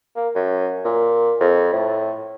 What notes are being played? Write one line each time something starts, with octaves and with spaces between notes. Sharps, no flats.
A#3
F#2
A#2
F2
A2